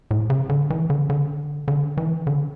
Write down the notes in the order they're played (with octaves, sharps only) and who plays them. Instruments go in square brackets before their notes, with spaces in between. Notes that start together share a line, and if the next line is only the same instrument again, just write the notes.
[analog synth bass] A2
C#3
D3
E3
D3
D3
D3
E3
D3